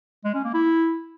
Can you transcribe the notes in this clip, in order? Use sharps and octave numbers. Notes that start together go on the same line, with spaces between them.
G#3
C#4
A#3
E4